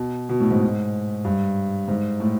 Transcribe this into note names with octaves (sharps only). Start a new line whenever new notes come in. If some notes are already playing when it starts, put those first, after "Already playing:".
Already playing: B2
B2
A2
G#2
G2
G#2
A2